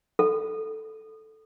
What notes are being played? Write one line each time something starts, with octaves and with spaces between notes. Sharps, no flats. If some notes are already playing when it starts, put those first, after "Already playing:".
A4